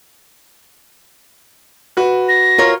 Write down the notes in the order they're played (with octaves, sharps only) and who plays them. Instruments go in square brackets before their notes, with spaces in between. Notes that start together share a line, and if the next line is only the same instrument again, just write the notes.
[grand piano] F#4 B4
[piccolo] A#6
[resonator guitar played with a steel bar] F4 A#4 C#5